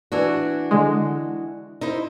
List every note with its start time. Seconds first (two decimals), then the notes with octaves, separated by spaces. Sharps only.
0.12 E3 D4 F#4
0.71 D3 G#3
1.81 D#4 E4 C5